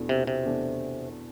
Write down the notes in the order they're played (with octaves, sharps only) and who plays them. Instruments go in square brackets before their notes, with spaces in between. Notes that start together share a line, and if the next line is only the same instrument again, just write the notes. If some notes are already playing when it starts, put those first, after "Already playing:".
Already playing: [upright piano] E2 B2 A3 D4
[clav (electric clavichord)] C3
C3
[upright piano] E2 B2 A3 D4